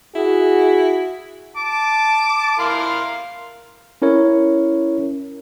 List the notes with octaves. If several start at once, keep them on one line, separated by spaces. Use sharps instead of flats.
E4 F#4 G#4
A5 D6
E4 A#4 F5 C6
C#4 E4 A#4 C#5